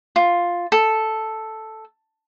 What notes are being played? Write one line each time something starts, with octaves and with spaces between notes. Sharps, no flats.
F4
A4